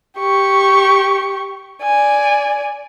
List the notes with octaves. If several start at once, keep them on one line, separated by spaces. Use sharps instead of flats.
G4 C#6
D5 G#5